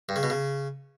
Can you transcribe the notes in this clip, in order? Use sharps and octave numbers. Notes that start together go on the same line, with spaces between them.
G2
C#3
B2
C#3